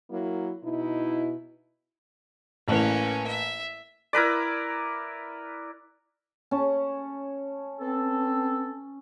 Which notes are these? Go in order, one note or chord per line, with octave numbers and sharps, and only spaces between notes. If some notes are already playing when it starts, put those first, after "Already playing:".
F#3 A#3 E4
B2 D#4 E4
A1 A2 A#3 C#4 B4
E5
E4 A#4 B4 D5
C#4 A5
B3 C4 A4